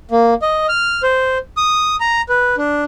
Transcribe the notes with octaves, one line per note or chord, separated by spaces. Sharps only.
A#3
D#5
F6
C5
D#6
A#5
B4
D4